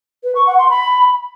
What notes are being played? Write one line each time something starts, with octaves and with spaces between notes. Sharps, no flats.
B4
C#6
F#5
C6
B5